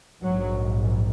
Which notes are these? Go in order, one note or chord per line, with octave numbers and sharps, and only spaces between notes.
A#1 G#2 F#3